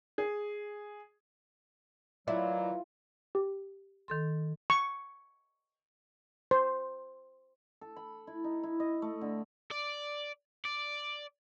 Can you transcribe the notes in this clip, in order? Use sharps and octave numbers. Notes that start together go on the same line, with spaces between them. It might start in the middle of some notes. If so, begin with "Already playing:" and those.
G#4
D#3 E3 F#3 E4 F4 D5
G4
D#3 A4 C6
C#6
C5
A4
B5
E4
D#4
E4
D#5
A3
D3
D5
D5